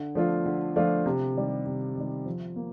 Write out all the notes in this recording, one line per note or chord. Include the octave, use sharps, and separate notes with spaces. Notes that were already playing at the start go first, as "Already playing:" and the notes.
Already playing: D3
F3 A3 D4 F4
D3
F3 A3 D4 F4
C3
D#3 G3
C3
D#3 G3
F3
A#3